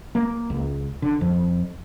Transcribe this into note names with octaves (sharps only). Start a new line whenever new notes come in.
A#3
C#2
D3
F2